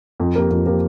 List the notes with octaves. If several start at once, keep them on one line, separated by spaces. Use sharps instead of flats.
F2
F3 A#3 G4 A#4
F2
F3 A#3 G4 A#4